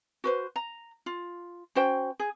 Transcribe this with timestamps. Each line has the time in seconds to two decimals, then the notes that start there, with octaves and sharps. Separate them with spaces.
0.24 F#4 B4 C5
0.56 A#5
1.06 F4
1.75 C#4 F#4 C5 G5
2.20 G#4